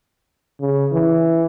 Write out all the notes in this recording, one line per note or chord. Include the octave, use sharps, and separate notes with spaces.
C#3
E3